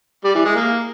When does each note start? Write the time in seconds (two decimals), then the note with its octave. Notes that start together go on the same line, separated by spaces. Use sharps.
0.24 G3
0.35 E3
0.45 G#3
0.56 A#3